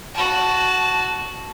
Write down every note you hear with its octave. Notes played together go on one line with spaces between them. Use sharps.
F#4 A5